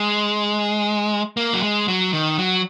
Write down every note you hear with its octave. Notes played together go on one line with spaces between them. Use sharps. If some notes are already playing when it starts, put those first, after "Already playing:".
Already playing: G#3
A#3
F#3
G#3
F#3
D#3
F#3